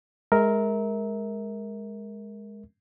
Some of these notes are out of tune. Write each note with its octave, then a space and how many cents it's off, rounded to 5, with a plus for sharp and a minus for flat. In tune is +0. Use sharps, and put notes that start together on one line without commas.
G#3 +0 A#4 +0 E5 -25